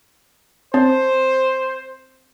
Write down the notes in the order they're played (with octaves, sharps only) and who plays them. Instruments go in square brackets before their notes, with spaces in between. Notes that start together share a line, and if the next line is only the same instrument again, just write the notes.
[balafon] C4 [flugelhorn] C5